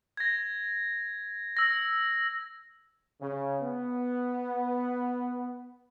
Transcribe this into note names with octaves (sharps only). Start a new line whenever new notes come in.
G#6 A#6
E6 A#6
C#3
B3